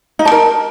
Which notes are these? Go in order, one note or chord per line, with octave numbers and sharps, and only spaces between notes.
D#4
A5
A#4